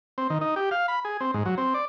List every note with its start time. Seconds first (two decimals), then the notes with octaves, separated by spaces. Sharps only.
0.18 C4
0.30 D#3
0.41 D#4
0.56 G4
0.71 F5
0.88 B5
1.05 G#4
1.21 C4
1.34 G#2
1.46 F#3
1.58 C4
1.74 D5